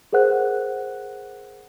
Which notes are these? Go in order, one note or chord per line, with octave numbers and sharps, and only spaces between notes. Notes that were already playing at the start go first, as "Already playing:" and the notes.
G#4 A#4 C5 F#5 F#6